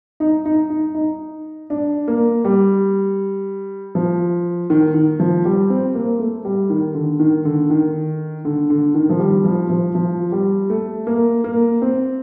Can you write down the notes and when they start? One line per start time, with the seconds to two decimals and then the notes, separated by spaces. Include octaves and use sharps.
0.20 D#4
0.45 D#4
0.70 D#4
0.95 D#4
1.70 D4
2.08 A#3
2.45 G3
3.95 F3
4.70 D#3
4.95 D#3
5.20 F3
5.45 G3
5.70 C4
5.95 A#3
6.19 A3
6.45 G3
6.70 D#3
6.95 D3
7.20 D#3
7.45 D3
7.70 D#3
8.45 D3
8.70 D3
8.95 D#3
9.10 F3
9.19 G3
9.45 F3
9.70 F3
9.95 F3
10.32 G3
10.70 A3
11.07 A#3
11.44 A#3
11.82 C4